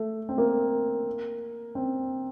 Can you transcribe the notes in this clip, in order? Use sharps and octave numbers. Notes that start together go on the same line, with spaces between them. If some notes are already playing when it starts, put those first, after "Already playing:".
Already playing: A3
C4
A#3
C4